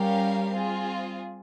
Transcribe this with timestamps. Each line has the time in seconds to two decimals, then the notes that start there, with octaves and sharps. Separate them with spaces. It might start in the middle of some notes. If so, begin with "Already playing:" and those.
Already playing: G3 C#4 G4 A#4 F5
0.54 C4 F4 G#4